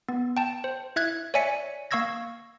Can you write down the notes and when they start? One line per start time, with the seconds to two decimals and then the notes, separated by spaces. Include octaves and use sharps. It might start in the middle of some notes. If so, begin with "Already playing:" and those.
0.09 B3
0.37 G5 A5
0.64 C5
0.96 E4 E5 F#6 G#6
1.34 C#5 D5 E5 G#5 B6 C#7
1.91 A#3 F5 C#6 E6 G#6 A#6